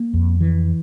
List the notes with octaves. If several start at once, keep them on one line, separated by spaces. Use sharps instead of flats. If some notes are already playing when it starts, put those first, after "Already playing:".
Already playing: A#3
F2
E3